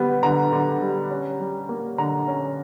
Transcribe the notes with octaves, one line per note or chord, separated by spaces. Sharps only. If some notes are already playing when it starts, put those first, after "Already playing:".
Already playing: D3 G3 B3
D3 A#5
D3
G3
C#4
G3
A#3
D3 A#5
C#4